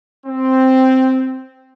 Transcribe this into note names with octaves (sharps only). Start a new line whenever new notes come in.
C4